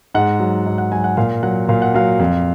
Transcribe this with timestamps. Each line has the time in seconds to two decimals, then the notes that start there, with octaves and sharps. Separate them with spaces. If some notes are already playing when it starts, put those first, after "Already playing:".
0.15 G#2 F#5
0.39 F#3
0.66 G#2
0.78 F#5
0.92 F#3 G#5
1.04 F#5
1.17 A#2 F5
1.43 F#3 F#5
1.69 A#2 F5
1.82 F#5
1.94 F#3 F5
2.19 F2